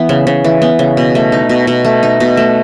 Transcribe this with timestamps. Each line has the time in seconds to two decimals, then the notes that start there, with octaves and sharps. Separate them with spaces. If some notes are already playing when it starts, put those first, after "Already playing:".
Already playing: E3 B3
0.09 C#3
0.27 C#3
0.44 E3
0.62 B3
0.79 C#3
0.97 B2
1.15 A3
1.32 D#4
1.49 B2
1.67 B2
1.85 A3
2.03 D#4
2.20 B2
2.37 A3